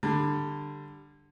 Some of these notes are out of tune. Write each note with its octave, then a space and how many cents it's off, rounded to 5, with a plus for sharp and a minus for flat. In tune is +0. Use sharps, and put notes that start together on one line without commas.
D3 +10 G3 +10